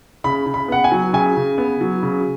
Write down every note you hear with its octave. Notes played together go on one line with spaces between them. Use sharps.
C#3 B5
C#3
B5
B3 F#5
G#5
F#3
C#3 G#5
C#3
B3
F#3
C#3